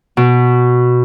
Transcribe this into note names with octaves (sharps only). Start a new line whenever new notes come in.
B2